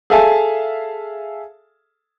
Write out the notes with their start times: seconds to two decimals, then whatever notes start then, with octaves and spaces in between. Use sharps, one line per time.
0.10 G#4 A4 E5 F5 G#5 A5